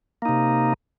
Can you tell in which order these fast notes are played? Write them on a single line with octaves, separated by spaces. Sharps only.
A#3 D#4 C3